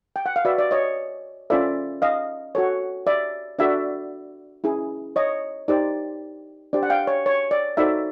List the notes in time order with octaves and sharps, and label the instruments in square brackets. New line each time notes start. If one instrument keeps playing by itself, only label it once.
[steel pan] G5
F#5
F5
F#4 B4 D5 E5
D5
C#5 D#5
C#4 F4 A4 C5 D5 E5
D#5 F5
F#4 A4 C#5
D5 E5
D4 F#4 A4 D5 E5
C#4 E4 G#4
C#5 D#5
D#4 G4 C5 D5
D4 G4 C5 D5
F#5
F5 G5
C#5
C#5
D5
D#4 F#4 A4 C5 D5 E5